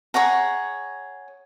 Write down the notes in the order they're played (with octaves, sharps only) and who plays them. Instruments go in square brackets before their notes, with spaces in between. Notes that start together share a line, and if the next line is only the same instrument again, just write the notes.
[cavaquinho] G#4 C#5 F#5 A#5